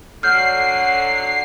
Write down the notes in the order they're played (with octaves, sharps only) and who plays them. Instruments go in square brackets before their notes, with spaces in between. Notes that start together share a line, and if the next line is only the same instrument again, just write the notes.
[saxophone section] D3 F#3 [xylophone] F6 G6 [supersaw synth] C7